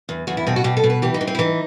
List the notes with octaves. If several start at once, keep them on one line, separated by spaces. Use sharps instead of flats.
E2
E2 F#4
E4
B2 C4
F#4
B2 G4
A4
B2
B4
E3 G4
D#4
E3
C4
E4
E3 D#4